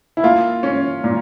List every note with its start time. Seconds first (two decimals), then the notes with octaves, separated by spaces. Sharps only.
0.17 E4
0.23 A#3 F4
0.63 C#4
1.04 A#2